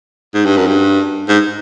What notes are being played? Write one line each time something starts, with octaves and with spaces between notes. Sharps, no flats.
G#2
G2
F#2
G2
G#2